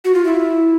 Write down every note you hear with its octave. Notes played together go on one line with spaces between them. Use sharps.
F#4
F4
E4